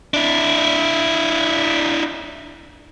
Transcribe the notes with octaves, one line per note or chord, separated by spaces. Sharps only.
D4 E4